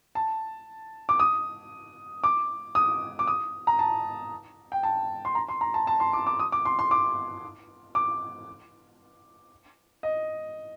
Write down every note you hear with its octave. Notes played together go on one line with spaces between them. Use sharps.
A5
D6
D#6
D6
D#6
D6
D#6
A#5
A5
G5
A5
C6
A#5
C6
A#5
A5
A5
C6
D6
D6
D#6
D6
C6
C6
D6
D6
D#5